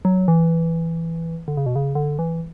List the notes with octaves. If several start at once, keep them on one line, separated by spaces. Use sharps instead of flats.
F#3
E3
D3
C#3
B2
C#3
D3
E3